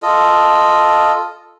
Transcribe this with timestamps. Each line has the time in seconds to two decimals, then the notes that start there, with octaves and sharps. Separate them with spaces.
0.03 F4 A4 D#5